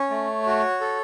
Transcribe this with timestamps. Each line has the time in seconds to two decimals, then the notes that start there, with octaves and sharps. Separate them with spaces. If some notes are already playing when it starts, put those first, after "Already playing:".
Already playing: C#4 C#5
0.10 A3
0.46 F#4
0.81 A4